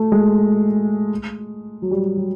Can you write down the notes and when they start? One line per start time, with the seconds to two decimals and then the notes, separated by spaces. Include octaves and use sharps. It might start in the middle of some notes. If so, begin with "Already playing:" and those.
Already playing: A3
0.12 G#3
1.82 F#3
1.91 G3
2.17 F#3